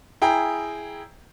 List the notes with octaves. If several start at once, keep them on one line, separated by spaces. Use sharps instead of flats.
E4 G#4 G5 A#5